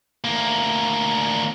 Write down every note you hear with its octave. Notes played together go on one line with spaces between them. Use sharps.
D2 A#3